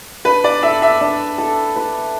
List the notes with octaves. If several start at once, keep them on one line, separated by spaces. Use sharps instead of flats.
D4 B4
D5
A4 E5
E5
D4
A4
B4